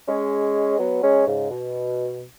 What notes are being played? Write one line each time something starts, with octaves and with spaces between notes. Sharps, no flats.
G#3 C#4
F#3 B3
G#3 C#4
G#2 C#3
B2